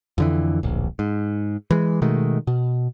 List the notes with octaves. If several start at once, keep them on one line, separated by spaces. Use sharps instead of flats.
F2 D3 E3
D1 A#1
G#2
E3 G#3
B2 D#3 G#3 A3
B2